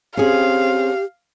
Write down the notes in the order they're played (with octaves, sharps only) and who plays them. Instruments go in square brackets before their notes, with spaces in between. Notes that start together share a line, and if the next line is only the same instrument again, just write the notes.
[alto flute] C4 [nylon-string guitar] C#4 G#4 [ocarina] G4 [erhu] F5